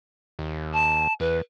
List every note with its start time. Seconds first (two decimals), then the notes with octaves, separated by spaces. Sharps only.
0.39 D#2
0.73 A5
1.20 E2 B4